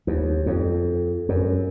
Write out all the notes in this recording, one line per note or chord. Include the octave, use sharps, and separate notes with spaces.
D#2
F2
F#2